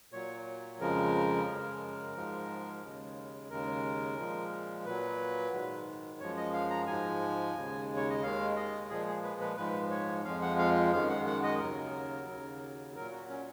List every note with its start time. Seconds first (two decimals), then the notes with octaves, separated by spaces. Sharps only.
0.12 A#2 F#3 C#5
0.80 F2 C#3 F3 G#3 A#4
1.47 F#2 C#3 G#3
2.15 G#2 F3 G#3
2.83 D#2 C#3 G#3
3.50 D#2 C#3 G#3 A#4
4.18 A#2 F3 G#3
4.85 A#2 F#3 B4
5.52 G#2 D#3 G#3
6.20 F#2 F3 G#3 C#5
6.37 D#5
6.54 F5
6.70 A#5
6.87 G#2 F3 G#3 G#5
7.54 D#2 C#3 G#3
7.97 C#5
8.10 D#5
8.23 D#2 D#3 G#3 F5
8.56 D#5
8.89 A#2 F3 G#3 G#4
9.07 G#4
9.23 B4
9.41 B4
9.57 G#2 F3 G#3 B4
9.91 C#5
10.24 F2 F3 G#3 F5
10.42 F#5
10.58 F5
10.93 F#2 D#3 G#3 F5
11.09 F#5
11.26 F#5
11.43 D#5
11.59 D#2 C#3 F#3 A#4
12.28 D#2 C#3 F#3
12.95 A#2 F#3 A#4
13.12 F#4
13.29 C#4